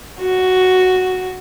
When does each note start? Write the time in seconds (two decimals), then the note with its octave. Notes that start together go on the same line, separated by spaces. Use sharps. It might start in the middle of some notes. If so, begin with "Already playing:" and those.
0.20 F#4